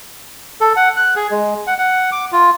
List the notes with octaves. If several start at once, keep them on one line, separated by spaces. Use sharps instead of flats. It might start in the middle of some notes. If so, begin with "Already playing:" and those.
A4
F#5
F#6
G#4
G#3
F#5
F#5
D6
F4